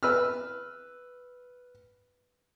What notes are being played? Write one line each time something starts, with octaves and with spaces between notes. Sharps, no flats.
B4 E6 F6